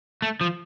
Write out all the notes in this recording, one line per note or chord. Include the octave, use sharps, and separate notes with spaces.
A3
F3